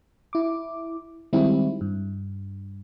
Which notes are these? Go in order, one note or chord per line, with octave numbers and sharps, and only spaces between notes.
E4 D6
D#3 G3 G#3 C4 E4
G2